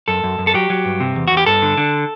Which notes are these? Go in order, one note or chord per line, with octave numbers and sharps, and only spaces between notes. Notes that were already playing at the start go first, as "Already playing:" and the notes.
F#2 A4
F#2
F#2
A4
F#3 G4
F#3
G2
C3
E2
E2 F#4
G4
G2 A4
D3
D3